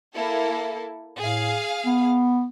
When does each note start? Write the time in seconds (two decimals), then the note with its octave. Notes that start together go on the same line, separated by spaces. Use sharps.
0.13 A#3 E4 A4
1.19 A2 G#4 F5
1.86 B3